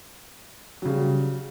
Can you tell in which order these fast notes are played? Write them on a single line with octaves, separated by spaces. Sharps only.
F#3 C#3 G3